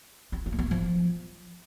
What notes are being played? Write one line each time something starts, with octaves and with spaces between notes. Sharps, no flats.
C4
C4
A#3
B3
F3